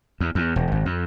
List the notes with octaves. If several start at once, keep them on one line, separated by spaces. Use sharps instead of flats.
E2
E2
E1
G#1
F2